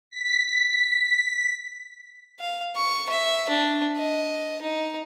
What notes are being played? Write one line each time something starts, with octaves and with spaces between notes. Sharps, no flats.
B6
F5
C#6
E5
D4
D#5
D#4